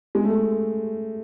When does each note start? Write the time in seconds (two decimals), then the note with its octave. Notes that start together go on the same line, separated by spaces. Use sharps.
0.15 G#3
0.25 A3